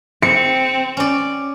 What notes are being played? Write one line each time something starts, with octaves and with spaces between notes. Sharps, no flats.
C4 C#7
C#4 D5